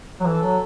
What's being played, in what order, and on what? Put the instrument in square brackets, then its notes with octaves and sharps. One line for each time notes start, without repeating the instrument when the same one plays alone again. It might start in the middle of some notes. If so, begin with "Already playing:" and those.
[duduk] F#3
[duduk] E3 [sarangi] A4
[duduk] F#3